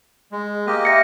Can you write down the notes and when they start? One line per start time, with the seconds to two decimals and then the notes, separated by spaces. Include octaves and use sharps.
0.32 G#3
0.67 A#3 G4 D#5
0.85 E5 A#6 C#7